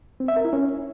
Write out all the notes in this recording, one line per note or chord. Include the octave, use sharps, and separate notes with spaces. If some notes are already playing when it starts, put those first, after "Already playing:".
C4
E5
A#4
E4
C#4